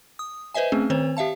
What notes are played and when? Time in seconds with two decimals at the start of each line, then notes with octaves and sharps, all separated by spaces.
0.19 D#6
0.54 B4 C5 D#5 E5 G#5
0.72 A3 C4 C#4 G#4
0.90 D#3 C4 C5 C#5
1.17 G4 E5 F5 A5